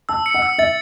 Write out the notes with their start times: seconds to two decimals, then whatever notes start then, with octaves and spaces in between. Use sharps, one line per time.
0.09 A5 E6
0.26 C#7
0.34 F#5
0.42 E6
0.58 E5 A6